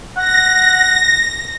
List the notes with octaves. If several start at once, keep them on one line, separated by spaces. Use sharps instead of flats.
F#5 A#6